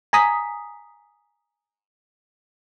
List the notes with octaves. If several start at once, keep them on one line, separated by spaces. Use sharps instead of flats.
G#5 A#5 D#6 B6